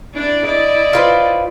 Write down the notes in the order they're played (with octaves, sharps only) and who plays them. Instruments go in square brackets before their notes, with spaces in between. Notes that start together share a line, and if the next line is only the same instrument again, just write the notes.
[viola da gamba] D4 E4 D5
E4 D5 D#5
[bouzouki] F4 B4 C5